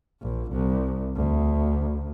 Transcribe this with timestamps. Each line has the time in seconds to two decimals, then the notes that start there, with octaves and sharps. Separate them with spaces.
0.22 A#1
0.52 C2
1.16 D2